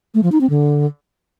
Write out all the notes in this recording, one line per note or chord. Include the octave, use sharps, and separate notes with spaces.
A3
F3
D#4
C4
D3